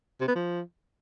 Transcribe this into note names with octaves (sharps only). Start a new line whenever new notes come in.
C3
B3
F3